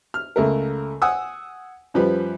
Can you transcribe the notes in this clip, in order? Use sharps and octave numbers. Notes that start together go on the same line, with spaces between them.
F6
C#2 A3 A#4
F#5 G#5 D#6 E6
F#2 F3 G3 B4